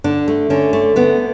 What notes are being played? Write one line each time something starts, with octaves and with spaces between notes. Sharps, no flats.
D3 D4
A3
D3 C#4
A3
D3 B3